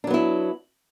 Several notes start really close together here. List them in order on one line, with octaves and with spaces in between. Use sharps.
D4 F#3 B3 E4